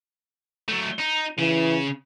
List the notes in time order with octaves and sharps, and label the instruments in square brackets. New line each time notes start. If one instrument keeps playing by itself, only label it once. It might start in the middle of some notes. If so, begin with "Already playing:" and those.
[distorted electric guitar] F#3 A3
D#4
[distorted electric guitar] C#3 [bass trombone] E3